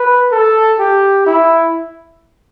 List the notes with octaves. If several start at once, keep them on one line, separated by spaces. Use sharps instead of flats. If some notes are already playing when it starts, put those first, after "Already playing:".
Already playing: B4
A4
G4
E4